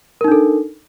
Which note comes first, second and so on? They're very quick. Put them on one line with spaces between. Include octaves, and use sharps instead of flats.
A#4 D#4 D4 A4